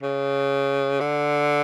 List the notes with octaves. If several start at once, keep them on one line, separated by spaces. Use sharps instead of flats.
C#3
D3